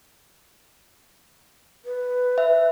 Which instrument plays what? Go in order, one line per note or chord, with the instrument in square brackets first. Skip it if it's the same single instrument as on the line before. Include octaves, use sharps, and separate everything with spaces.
[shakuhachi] B4
[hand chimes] E5